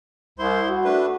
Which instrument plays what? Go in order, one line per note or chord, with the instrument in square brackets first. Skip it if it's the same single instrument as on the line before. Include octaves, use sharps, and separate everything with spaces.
[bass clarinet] C2 [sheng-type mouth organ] E4 C5 C6
[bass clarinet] F#4
[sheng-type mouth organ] A3 D4 B4